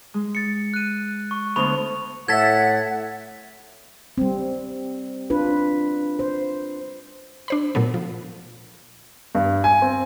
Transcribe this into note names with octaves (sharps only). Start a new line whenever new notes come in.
G#3
A6 C#7
F#6 D#7
C#6
D2 B3 C5 B5 C#6 F7
A2 A4 E5 F#5 G#6 A6 B6
G3 C4
D4 F4 B4
C5
D4 C5 B5
A#2 F#3 A3 B3
F3
G2
G#5
C4